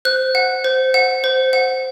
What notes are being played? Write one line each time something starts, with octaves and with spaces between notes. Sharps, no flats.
C5 F#6
F#5
C5
F#5
C5
F#5